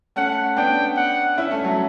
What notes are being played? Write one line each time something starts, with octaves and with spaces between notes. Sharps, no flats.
A3 C#4 F#5
B3 D4 G5
F#5
C#4 E4 E5
A3 C#4
F#3 A3